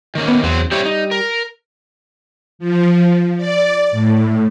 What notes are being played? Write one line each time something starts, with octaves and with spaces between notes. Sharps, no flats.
D#3 A#3 C#4
B3
E2 F#3 C4
G3 C4 E4 C#5
D#4
A#4
F3
D5
A2